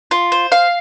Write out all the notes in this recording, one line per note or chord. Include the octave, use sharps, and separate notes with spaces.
F4
C5
F5